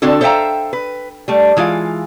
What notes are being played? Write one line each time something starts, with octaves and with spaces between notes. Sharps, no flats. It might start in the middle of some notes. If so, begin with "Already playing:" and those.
D3 C4 D4 F#4 A4
A4 C5 E5 F5 G5 A#5
B4
G3 A3
E3 G#3 F4 F5